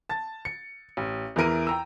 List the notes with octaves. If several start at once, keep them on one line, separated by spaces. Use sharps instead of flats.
A5 A6
C#7
A1
E2 E3 E4 A#4 D7 D#7
G5 A#5 E6